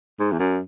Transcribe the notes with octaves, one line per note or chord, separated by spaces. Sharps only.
G#2
E2
F#2